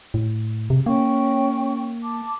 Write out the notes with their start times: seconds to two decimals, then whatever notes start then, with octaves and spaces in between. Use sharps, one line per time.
0.14 A2
0.70 C3
0.86 A#3 C#4 G5 C#6
2.02 A5 D6